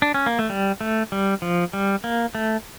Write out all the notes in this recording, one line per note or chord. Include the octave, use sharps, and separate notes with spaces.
D4
C#4
A#3
A3
G3
A3
G3
F3
G3
A#3
A3